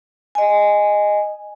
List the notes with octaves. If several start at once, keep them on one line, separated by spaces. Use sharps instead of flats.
D#5 G#5